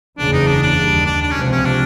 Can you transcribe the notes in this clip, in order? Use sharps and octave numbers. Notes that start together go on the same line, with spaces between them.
F#1 E2 C#3 E3 D4
D#4
D4
D4
D#2 D#3 G3
D4
D4
C#4
C#2 C3 F3
C#4
D4